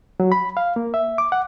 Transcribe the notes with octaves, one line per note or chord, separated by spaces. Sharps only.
F#3
B5
F5
A#3
E5
D6
F#5